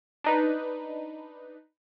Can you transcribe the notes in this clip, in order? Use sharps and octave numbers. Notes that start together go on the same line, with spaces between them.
D4 D#4 B4